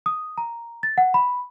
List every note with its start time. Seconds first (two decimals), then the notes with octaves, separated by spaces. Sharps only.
0.06 D#6
0.38 A#5
0.83 A6
0.98 F#5
1.14 B5